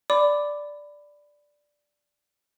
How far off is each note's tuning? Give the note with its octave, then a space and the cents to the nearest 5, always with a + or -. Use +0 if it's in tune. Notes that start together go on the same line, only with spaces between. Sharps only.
D5 +0 B5 +15 D6 +0